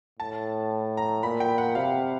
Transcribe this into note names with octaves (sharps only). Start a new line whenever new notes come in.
A2 A5
A#5
A#2 B5
G5
F#5
C3 F5